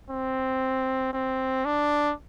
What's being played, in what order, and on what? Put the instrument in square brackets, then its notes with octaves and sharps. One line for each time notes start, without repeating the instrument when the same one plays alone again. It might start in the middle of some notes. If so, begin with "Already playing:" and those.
[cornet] C4
C4
D4